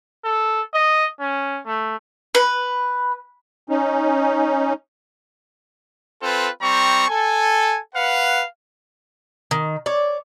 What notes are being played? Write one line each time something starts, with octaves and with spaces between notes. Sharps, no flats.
A4
D#5
C#4
A3
B4
C#4 D#4
C4 F4 A4 B4
G3 C4 A#5 C#6
A4 G#5
B4 F5 F#5
D#3
C#5 D5